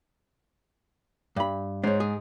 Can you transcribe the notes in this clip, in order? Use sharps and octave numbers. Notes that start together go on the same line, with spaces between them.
G2 B5
G#2 C5 C#5
G#4